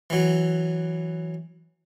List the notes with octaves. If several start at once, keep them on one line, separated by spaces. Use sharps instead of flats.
E3 F#3